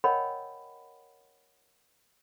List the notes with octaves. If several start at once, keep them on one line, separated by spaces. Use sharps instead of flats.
A#4 C#5 D#5 F#5 G5 B5